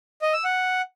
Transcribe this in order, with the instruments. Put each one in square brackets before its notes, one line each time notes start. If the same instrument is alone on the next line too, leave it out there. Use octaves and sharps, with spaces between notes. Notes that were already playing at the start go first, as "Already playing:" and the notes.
[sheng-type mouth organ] D#5
E6
F#5